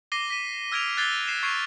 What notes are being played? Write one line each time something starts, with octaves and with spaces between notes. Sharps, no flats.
D6 A#6 C7 D#7 G7
B6 D#7
E6 F6 G#6 A#6 D7 F7
F#6 G#6 A6 C7 G7
C7 E7
C#6 G#6 C7 D7